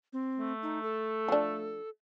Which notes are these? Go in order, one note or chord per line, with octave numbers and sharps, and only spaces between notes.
C4
A3
D#4
A4
F3 D4